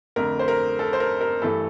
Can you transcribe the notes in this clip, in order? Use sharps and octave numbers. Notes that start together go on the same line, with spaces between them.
F2 D3 A3 A#4
C5
A#4
A4
C5
A#4
A#4
G2 E3 A3 A4